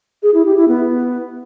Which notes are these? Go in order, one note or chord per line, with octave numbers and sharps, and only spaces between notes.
G#4
E4
G4
E4
B3